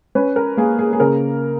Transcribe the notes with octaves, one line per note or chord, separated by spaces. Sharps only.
C#4 B4
A#4
A#3 G#4
G#4
G#4
C#3 A#4